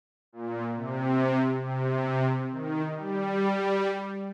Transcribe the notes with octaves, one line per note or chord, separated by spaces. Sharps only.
A#2
C3
C3
D#3
G3